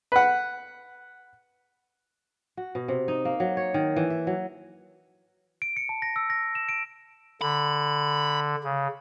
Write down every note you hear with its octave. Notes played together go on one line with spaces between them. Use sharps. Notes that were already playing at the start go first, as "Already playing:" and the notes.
B4 F#5
F#4
B2
C3
D#4
A#3
F#3
C#5
D#3
E3
E5
F#3
D7
C#7
A5
A#6
E6
A#6
E7
D7
D3 B5
C#3